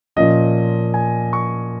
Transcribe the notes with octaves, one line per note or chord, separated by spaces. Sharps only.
A#2 F3 C#4 D#5
G#5
C#6